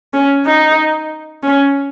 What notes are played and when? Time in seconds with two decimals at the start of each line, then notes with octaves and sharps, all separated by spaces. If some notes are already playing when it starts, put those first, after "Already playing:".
0.13 C#4
0.45 D#4
1.43 C#4